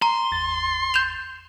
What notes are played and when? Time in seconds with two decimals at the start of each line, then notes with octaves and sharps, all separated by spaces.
0.02 A#5 C6
0.31 G#1 E2 A6
0.94 G6 E7 F7